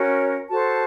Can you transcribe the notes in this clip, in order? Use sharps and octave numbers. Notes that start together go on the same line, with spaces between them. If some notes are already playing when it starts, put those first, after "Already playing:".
Already playing: C#4 F#4 A#4 C#5
F#4 A4 C5 A5